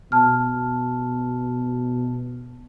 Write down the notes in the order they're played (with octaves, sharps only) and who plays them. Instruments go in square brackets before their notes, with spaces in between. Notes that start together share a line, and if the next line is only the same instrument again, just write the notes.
[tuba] B2 [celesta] A5 F6